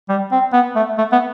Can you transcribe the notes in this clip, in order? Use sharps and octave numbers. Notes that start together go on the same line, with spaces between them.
G3
C4
B3
A3
A3
B3